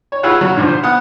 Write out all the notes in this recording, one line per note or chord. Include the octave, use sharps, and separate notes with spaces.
C#5
E4 F4 G#4 B4 C#5 F#5
F#3 C#4 C#5
G2 A#2 D3 F3
C5
B3 F#5 D#6 F#6